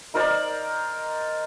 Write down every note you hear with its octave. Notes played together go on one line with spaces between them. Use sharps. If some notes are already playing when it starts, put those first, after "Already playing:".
D#4 A#4 C5 D5